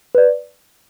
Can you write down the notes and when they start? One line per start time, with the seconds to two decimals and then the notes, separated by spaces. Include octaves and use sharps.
0.15 B4 D5